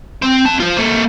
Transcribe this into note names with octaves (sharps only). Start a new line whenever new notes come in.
C4
C4 A5
F4 C5
A#3 A4